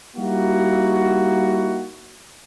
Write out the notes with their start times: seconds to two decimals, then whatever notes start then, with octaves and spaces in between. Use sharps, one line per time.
0.16 G3 A#3 D#4 E4 F#4